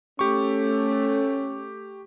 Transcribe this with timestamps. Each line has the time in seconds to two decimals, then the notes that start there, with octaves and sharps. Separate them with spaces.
0.19 A3 C#4 G4 C#6